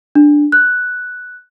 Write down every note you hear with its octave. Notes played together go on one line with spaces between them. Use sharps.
D4
F#6